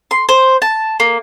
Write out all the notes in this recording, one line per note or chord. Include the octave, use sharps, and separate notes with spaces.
C6
C5
A5
A#3